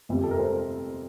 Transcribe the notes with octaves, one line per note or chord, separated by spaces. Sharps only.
G1 F2 C3 G3
A4
A#4
A4 C5